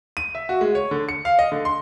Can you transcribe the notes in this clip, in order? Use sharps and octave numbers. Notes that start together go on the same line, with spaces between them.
D#7
E5
F#4
G#3
C#5
D3
C#7
F5
D#5
D3
C6